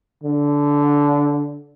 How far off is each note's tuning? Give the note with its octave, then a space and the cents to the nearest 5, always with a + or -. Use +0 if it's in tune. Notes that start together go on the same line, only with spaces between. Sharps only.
D3 -15